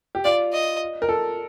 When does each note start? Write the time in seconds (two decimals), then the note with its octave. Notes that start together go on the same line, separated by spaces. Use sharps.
0.15 G4
0.24 F4 D5
0.53 D#5
1.02 A#4
1.09 A4